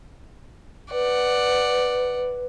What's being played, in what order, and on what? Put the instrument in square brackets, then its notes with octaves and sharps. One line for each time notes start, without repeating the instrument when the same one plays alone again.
[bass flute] B4 [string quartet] D5 F#5